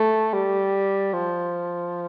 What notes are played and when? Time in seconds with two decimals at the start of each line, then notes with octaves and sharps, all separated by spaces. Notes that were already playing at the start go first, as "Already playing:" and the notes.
Already playing: A3
0.33 G3
1.13 F3